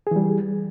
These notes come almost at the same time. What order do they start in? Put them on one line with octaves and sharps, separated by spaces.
G#4 E3 G3